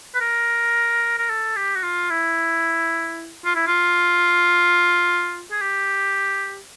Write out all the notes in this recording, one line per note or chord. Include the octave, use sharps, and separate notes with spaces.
B4
A#4
A#4
A4
G4
F#4
F4
E4
F4
E4
F4
G#4
G4